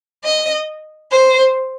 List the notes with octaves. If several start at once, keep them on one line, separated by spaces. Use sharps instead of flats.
D#5
C5